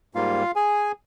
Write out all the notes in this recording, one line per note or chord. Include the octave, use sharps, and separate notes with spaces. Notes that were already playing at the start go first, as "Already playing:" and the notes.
G#2 G3 A#3 F4 F5
G#4 G#5